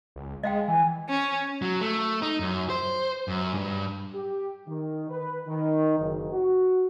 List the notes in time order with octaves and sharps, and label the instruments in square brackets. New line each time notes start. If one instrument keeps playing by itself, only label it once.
[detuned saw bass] C#2
[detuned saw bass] G#3 [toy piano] D#5 F5 G5
[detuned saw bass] E3 [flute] G#5
[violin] C#4
[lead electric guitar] F#3
A3
D#4
F#2
C5
F#2
G2
[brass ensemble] G4
D#3
B4
D#3
F#1
F#4